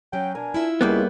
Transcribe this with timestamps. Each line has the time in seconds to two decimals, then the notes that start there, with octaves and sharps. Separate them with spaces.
0.13 F#3 C#4 G5
0.35 B2 D4 A#4 G#5
0.54 E4 F4 E5
0.81 C#2 G3 A#3 B3